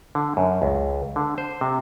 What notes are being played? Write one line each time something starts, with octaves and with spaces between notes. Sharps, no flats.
D3
F#2
C#2
D3
C5
C3